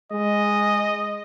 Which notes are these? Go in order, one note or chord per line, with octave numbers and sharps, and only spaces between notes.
G#3 D#5